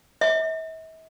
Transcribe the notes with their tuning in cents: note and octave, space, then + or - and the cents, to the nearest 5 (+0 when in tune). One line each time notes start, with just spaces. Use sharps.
E5 -45